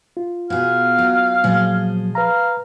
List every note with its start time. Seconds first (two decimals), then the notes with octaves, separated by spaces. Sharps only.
0.17 F4
0.50 B2 G#4 F5
0.99 F#3
1.44 A#2 F3 F#3 G#4 C5
2.15 B4 F5 A#5